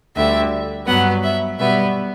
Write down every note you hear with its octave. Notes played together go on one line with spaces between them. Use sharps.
D2 D3 G3 E5
G2 F#3 B3 F#5
E5
B2 G3 B3 E5